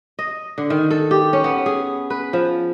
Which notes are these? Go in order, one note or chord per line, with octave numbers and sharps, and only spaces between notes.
D#5
D3
D#3
A4
G4
C#4
B3
G#4
B4
F3